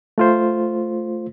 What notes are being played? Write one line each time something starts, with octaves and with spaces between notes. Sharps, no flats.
A3 F4 C5